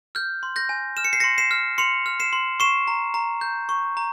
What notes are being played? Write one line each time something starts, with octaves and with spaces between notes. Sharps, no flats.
F6 G6
C6
G6 A#6
G#5
F6 E7
C#7
C7
C6 A#6 C#7
C7 E7
F6
C6 C#7 F7
F6
C7 E7
C6
C#6 C7 E7
A#5
A#5
G6
C#6
A#5